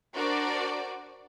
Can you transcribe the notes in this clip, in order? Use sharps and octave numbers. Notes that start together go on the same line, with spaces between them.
D4 F#4 A#4 C5 D5